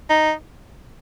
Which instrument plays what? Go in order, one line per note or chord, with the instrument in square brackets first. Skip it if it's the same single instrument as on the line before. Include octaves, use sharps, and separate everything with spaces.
[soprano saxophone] D#4